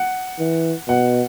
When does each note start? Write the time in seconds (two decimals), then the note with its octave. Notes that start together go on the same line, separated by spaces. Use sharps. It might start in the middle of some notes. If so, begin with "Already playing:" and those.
Already playing: F#5
0.39 E3
0.88 B2 F#5